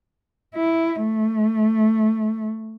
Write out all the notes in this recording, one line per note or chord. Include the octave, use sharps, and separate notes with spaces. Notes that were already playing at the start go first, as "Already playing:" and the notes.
E4
A3